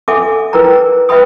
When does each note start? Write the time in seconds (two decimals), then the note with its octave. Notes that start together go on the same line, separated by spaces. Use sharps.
0.08 A4 E5 F#5 G#5 D6
0.53 E4 A#4 B4 G5 A#5
1.09 B4 E5 G5 B5 D#6